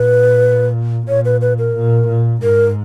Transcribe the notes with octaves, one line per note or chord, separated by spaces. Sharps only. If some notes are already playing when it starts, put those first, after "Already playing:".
Already playing: A#2 B4
A#2 C#5
B4
B4
A#4
A#2
A#2
G#2 A#4